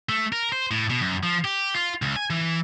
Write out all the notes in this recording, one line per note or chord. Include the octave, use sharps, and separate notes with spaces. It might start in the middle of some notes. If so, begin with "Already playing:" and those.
A3
A#4
C5
A2
B2
F#2
F3
G4
F4
C#2
G#5
E3